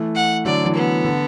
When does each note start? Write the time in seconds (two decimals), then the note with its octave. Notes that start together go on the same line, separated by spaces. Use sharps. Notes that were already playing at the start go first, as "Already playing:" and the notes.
Already playing: E3 A3
0.16 F#5
0.45 D3 F#3 D5
0.65 E3
0.76 B3
1.04 D3